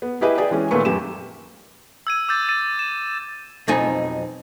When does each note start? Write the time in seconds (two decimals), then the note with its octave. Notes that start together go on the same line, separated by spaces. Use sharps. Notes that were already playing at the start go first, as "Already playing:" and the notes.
0.02 B3
0.21 E4 G4 G#4 B4 D#5 E5
0.38 G4 G#4 D5 G5
0.51 E3 G#3 C#4
0.71 A#2 D#3 A3 B3 B4 C#6
0.85 F#2 G4 E7
2.07 E6 G#6 D#7
2.28 D6 E6 G6 A6
2.49 E6 A6 D#7
2.79 E7
3.68 B1 F2 C4 D#4 G#5